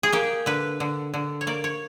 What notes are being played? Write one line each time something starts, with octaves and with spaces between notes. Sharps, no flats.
G#4
A#3 G4
D3 B4
D3
D3
C#5
A#3 D5
C#5